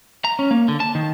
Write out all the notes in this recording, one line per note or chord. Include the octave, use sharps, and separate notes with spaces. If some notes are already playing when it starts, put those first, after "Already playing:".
A#5
C#4
A#3
D3
A5
D#3